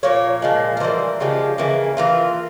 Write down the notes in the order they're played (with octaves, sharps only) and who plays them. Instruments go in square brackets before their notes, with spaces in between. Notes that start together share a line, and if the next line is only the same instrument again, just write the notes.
[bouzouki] A#2 F3 A#3 C#5
A#2 F3 G#3
A#4
E3 G3 A#3 C5
C#3 F3 G#3 G4
C#3 E3 A#3
E3 A#3 F4